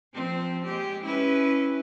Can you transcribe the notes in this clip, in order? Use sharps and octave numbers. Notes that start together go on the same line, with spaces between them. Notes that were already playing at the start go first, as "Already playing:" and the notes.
F3 C4
G#3 G4
C#4 E4 B4